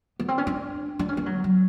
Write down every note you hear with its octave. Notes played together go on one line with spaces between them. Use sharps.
B3
C4
C#4
D4
D4
C#4
B3
F#3
F#3